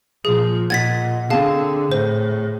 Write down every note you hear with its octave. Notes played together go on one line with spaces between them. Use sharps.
A#2 F3 G#4
A#2 D#5 F#5 G#6 A6 B6
D3 C4 G#4 F5 A5
A2 C5